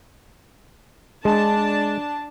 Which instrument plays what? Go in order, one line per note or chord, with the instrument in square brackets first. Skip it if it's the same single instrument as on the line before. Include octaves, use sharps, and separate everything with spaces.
[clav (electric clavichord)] G#3 [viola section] D4 A5